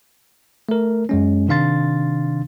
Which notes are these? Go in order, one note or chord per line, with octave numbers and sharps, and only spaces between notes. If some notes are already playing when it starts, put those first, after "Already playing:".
A3 A#4
F#2 G#3 C#4
C3 D#3 D4 F5 C6 A6